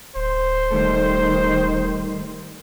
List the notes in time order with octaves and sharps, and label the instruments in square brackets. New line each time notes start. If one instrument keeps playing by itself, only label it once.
[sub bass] D1 [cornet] C5
[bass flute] D#3 [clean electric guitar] G3 A3 A4